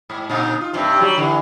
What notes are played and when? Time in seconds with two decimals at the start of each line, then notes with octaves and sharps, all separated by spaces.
0.10 G#2
0.30 A#2 D#4
0.61 F4
0.73 G2 C3
1.00 F#3 G3
1.17 D3 E3